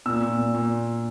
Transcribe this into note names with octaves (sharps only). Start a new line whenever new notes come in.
A#2 E6
A#2
A#2
A#2